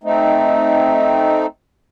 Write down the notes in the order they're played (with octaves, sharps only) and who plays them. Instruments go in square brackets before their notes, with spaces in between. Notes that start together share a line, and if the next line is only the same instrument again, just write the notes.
[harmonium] A3 C4 D#4